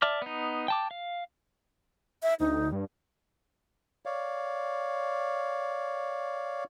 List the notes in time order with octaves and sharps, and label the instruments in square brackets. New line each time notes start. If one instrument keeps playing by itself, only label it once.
[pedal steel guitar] D5 E5 A5 D6 F6
B3 D#4
G5 A5 D6
F5
[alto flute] E5
[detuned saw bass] D2 [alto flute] D#4
[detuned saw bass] G2
[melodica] C#5 D5 F5